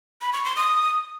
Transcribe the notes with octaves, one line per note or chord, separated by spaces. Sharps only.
B5
C#6
C6
D#6